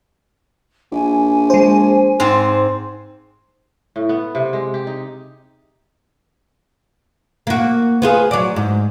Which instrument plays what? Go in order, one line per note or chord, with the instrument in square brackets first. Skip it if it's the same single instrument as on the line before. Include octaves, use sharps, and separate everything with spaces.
[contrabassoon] A#1 [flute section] G#5
[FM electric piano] G#3 C5
[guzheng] G#2 C4
[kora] A2
B3
C3
G#3
G4
D#4
[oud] A#3 F#4
B3 F4 G#4
F#3 D5
G#2